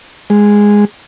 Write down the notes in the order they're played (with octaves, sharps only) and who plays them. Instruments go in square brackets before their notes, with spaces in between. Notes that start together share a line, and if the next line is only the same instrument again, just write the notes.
[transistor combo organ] G#3